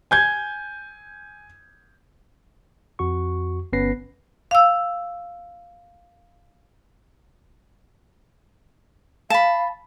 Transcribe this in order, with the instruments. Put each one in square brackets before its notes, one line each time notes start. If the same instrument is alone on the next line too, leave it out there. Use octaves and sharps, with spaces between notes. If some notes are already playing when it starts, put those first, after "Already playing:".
[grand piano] G#5 G6 G#6
[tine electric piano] F2 F#4 C#6
G1 B3 C#4 B4 A#6 C7
[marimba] F5 E6
[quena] F5 [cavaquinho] A5 B5